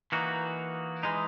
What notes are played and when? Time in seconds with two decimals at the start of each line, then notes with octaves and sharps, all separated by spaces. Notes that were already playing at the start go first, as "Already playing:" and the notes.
0.12 E3 A#3 D#4 F#4
1.03 E3 G#3 D#4